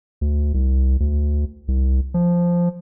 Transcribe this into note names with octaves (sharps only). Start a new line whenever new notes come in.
D2
C2
D2
C2
F3